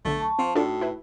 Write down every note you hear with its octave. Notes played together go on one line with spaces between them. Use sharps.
B1 D3 A3
A5 C#6
F3 C4
A2 D4 D#4 F4 F#4 A4
E4 B4